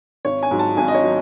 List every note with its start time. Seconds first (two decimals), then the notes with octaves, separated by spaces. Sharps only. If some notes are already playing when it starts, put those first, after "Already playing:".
0.25 G#1 C#5
0.43 G#5
0.51 G#2 F#3
0.59 A5
0.77 G#1 G#5
0.88 D#5
0.94 C#5
1.04 F#3